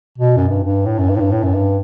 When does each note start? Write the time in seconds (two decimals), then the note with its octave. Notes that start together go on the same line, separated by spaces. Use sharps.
0.18 B2
0.36 F#2
0.49 G2
0.64 G2
0.86 A2
0.98 F#2
1.09 G2
1.16 A2
1.20 G2
1.32 A2
1.43 F#2
1.54 G2